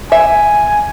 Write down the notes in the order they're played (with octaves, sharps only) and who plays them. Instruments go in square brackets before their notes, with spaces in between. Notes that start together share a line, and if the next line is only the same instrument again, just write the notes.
[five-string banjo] E5 [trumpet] G#5